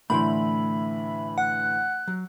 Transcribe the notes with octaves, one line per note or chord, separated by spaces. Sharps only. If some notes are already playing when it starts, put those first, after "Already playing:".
A2 D3 E3 A3 E4 E5 B5 C6
F#5 F#6
F#3